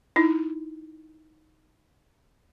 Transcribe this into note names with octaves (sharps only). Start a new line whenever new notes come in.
D#4 E4